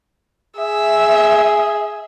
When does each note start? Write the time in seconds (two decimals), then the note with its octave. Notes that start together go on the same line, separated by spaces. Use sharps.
0.57 G#4 E5